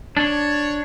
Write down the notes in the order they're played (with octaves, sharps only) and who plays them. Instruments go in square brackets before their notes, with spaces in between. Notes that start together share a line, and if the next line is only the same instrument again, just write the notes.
[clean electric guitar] D4 [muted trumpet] C#5